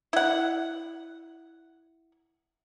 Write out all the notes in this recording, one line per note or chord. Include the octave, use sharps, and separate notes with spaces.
E4 F#5